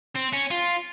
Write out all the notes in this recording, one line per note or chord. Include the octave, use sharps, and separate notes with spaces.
C4
C#4
F4